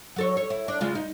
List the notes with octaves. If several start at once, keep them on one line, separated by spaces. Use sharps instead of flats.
F#3 A4 C#5
C#5
E4
D4
C#3 G#3 F4
D#4